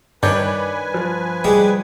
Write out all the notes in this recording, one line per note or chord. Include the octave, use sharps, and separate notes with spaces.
G2 D#3 B4 C#5 D5 G#5 G6
F3
G3 G#3